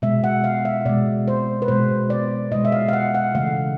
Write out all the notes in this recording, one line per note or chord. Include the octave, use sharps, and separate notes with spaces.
B2 G#3 E5
F#5
F5
E5
B2 G#3 D5
C5
B4
B2 G#3 C5
D5
B2 G#3 D#5
E5
F5
F5
F#5
F#5
C#3 E3 A3 F5